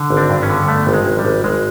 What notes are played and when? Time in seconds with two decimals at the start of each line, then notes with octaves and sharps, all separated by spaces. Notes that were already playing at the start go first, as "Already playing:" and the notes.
Already playing: D3
0.10 G#1
0.17 C4 D4
0.30 G2
0.42 B3 C#4
0.50 D3
0.68 G2 A3 B3
0.87 G#1
0.93 G#3
1.06 G#1
1.19 G3
1.25 G#1
1.44 G#1 G#3